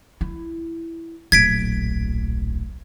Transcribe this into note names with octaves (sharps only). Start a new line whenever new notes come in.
E4
D1 A#1 G#6 B6 D7